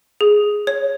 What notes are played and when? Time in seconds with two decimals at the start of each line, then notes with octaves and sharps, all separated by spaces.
0.21 G#4
0.67 C#5